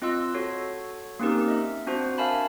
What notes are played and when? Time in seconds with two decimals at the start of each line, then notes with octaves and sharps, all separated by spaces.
0.02 C4 F4 D#5 C6 E6
0.34 F#4 A4 C#5
1.19 A#3 C4 C#4 D#4 G4 A#4
1.48 D#5 E5
1.87 C4 D4 F#4 C5
2.18 A#4 E5 F5 G#5 A5 B5